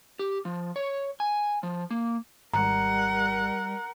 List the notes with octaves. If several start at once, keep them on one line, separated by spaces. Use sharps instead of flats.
G4
F3
C#5
G#5
F3
A#3
G#1 G3 A#4 F#5 A#5